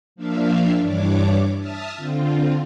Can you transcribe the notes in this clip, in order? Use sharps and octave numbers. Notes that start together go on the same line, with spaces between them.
F3 A#3 D4 E5 F5
G2 E3 D4 C#5 D6
E5 A5 D#6 F6
D3 C4 F4